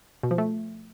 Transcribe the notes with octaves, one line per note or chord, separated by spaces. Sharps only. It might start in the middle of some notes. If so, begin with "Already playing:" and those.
B2
F3
A3